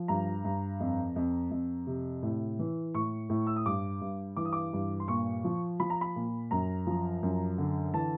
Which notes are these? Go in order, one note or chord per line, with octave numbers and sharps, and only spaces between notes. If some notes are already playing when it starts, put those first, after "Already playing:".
Already playing: F3
G2 A#5
G2
F2
F2
F2
C3
A2
E3
A2 C#6
A2
E6
D#6
G2 D6
G2
E3 D6
D#6
D6
G2
C6
A#2 C#6
F3
F3 B5
A#5
B5
A#2
F#2 A#5
F3
F#2
D3
E3 A5